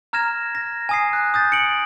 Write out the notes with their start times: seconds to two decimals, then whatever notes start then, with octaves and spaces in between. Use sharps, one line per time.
0.13 A#5 F6 G#6 A#6 E7
0.55 A#6
0.89 G#5 D#6 C7
1.13 F#6
1.34 D#6 G6 A6
1.52 C#7 D7 F#7